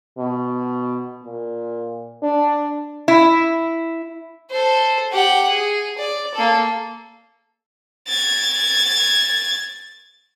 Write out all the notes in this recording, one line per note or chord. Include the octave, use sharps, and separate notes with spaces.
B2
A#2
D4
E4
A4 C5
G4 F#5
G#4
D5
A#3 A4
G#6 A6